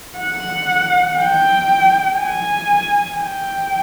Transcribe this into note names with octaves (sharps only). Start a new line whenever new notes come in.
F#5
G5
G#5
G5